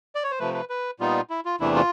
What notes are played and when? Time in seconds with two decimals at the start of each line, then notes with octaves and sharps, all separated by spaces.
0.15 D5
0.23 C#5
0.31 C5
0.39 C3 F3 A3 B4
0.54 B4
0.70 B4
1.00 A#2 G3 B3 D#4 F4
1.30 E4
1.45 F4
1.60 E2 C3 E3 A3 D4 E4
1.75 F4